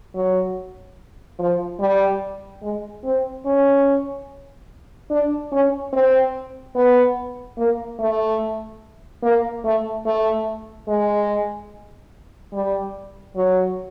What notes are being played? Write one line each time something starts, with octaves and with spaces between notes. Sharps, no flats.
F#3
F3
G3
G#3
C4
C#4
D4
C#4
C4
B3
A#3
A3
A#3
A3
A3
G#3
G3
F#3